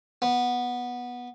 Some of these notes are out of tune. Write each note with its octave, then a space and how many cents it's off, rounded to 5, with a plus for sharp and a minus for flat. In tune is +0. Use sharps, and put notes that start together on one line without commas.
B3 -10